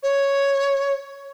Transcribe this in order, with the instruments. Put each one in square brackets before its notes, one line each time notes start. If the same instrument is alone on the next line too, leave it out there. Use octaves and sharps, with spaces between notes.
[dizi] C#5